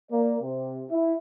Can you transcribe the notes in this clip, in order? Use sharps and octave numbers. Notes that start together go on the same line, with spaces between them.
A#3 D5
C3
E4